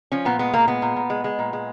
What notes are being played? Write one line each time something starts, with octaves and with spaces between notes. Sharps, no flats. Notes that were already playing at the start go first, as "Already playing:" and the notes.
F3 C#4
A#2 B3
G#3 B3
A#2 A#3
G#3 B3
A#2
A#2
G#3
G#3
A#2
G#3